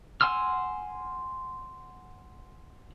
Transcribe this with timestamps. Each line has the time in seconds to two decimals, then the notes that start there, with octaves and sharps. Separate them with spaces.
0.21 F#5 G#5 C6 E6 F6